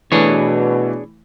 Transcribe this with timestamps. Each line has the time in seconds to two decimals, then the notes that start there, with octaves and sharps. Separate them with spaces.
0.12 B2 E3 A3 D4 G#4 C#5